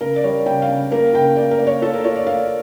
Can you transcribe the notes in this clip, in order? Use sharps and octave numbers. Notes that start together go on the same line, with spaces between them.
C#3 A#4
D5
G3 C#5
C#3 G5
F5
C#3
A#3 A#4
C#3 G5
A#3 D5
A#4
A#3
C#5
F4 A4
A#4
F4 C#5
D5
A#3 F5